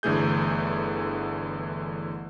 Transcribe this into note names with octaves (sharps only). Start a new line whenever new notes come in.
G1 D3 E3 A3 G#4 G6